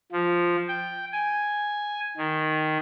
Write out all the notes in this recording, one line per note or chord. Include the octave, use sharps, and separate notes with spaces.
F3
G5
G#5
D#3